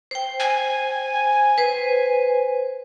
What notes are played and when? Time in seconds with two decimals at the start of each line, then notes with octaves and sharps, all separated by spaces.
0.11 C5 G5
0.40 G#5
1.58 B4 C5